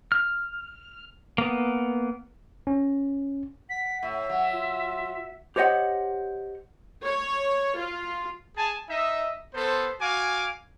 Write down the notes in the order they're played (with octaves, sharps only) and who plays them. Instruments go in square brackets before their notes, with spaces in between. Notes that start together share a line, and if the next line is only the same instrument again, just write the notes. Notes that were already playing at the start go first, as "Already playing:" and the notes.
[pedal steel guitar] F6
A#3 B3
[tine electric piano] C#4
[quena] F#5 [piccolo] B6
[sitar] A2 [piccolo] E5
[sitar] F#3 [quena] F#5
[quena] F4
[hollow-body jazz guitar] G4 C5 C#5 D#5 F#5
[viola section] C#5
F4
[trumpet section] G#4 G#5 A5
D#4 D#5 E5
B3 A4 C5
F#4 F5 G#5 D6